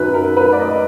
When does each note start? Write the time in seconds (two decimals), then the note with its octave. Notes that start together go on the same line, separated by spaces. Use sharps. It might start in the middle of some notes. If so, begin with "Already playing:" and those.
Already playing: F#2 D#3 F#3 B4
0.14 A#4
0.37 B4
0.53 D5
0.60 D#5